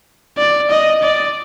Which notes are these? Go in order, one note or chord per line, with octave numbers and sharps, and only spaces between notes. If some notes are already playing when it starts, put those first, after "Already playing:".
D5
D#5
D5